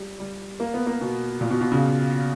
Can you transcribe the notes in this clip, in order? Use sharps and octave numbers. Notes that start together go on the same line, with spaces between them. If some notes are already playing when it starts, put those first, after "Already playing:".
Already playing: G3
G3
A#3
B3
A#3
B2
A#2
B2
B2
C#3